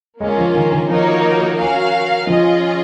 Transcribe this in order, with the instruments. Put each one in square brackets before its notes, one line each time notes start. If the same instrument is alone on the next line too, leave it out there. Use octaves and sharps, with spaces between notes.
[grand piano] G#3 [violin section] A#3 C#4 F4 A#4
[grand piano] F3
D#3
D#3
[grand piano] F3 [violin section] A#3 D#4 F#4 A#4 C#5
[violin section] C#4 F#4 A#4 F5
[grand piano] F3 [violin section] C#4 F4 G#4 D#5